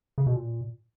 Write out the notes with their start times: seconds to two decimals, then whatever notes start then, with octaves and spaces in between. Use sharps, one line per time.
0.18 C#3
0.27 B2
0.35 A#2